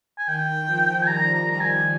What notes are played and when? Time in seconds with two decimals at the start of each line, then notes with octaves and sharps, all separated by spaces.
0.18 G#5
0.27 D#3 G5
0.67 F3
1.03 G#5
1.07 G3 A#5
1.34 A#5
1.47 D#3 A#5
1.61 G#5